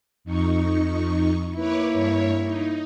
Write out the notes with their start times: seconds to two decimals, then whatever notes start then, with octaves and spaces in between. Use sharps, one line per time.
0.24 F2 D#4 C#6
1.56 A#3 E4 B4 C#5 D6
1.93 G2 C#5
2.45 D#4